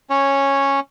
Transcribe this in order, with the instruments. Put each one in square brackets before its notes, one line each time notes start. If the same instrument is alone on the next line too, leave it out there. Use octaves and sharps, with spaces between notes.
[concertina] C#4 C#5